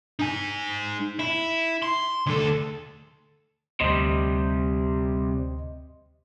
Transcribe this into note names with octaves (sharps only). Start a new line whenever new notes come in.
D#4 G#5
E4
C6
D2 A4
D2 C3 G3 D#5 C6